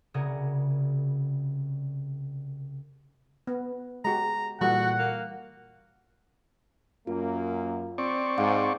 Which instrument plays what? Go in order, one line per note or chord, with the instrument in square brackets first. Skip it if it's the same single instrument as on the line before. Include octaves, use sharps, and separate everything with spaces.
[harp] C2 C#3 F#4 G#4 A#4 D5
[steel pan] B3
[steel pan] G#3 F#4 G4 [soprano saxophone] A#5
[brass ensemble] A#2 F#5 [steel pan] E3 G3 A4 [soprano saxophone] F#4
[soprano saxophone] A#3
[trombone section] F#2 A#3 [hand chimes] F4
[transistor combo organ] C4 D5 C#6
[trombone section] G#2 [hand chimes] F5 F#5 D6